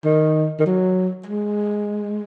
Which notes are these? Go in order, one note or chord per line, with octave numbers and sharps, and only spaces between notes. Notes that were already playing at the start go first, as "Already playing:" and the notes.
D#3
D#3
F#3
G#3